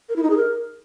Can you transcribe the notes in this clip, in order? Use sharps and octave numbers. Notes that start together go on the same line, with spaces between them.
A#4
E4
D#4
G#4
A#4